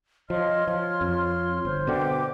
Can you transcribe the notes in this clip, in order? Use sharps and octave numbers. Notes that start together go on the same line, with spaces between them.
F3 C#5 D#5 C6 F6
F3 F4
F2
G1 C5
B2 D3 E5 G5 D6